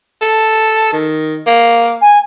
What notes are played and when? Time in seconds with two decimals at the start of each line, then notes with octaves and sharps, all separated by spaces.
0.21 A4
0.92 D#3
1.47 A#3
2.02 G#5